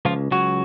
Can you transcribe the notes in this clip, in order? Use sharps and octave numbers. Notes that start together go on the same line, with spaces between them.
C#2 F3 F4
C#2 F#3 F#4